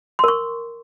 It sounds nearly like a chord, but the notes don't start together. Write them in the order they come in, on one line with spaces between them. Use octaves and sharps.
C6 A#4 C#6